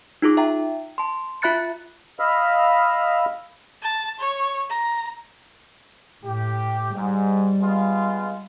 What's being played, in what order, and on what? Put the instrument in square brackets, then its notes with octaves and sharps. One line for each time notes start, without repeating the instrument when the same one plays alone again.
[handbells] D#4 F4 G#4 D6
E5 G5 A#5
A5 C6
F4 E5 B5 F#6 A6 C#7
[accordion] D#5 F5 B5 E6 F6
[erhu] A5
C#5
A#5
[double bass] A2 [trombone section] G4
[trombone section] G#2 [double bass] G3
[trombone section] G#3 B3 F4